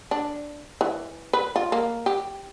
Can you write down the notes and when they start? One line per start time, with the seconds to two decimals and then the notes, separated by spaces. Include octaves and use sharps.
0.11 D4
0.81 E3
1.33 B4
1.56 F4
1.72 A#3
2.06 G4